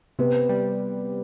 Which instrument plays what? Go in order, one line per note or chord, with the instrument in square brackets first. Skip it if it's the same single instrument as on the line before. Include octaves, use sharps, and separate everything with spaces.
[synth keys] C3 [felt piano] B3 B4
[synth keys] G3